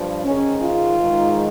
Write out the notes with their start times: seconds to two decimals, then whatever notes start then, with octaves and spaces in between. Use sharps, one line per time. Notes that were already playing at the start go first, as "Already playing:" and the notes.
Already playing: G2 F3
0.25 G#2 D#3 G#3 C#4
0.62 F4
0.99 G#2 D#3 G#3